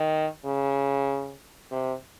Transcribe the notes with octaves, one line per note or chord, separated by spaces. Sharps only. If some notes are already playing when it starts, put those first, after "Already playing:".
Already playing: D#3
C#3
C3